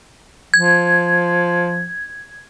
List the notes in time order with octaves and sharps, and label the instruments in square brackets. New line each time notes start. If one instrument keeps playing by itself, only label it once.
[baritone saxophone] F3 [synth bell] G#6